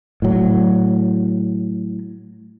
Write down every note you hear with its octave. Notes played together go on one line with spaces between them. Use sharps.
A2 F#3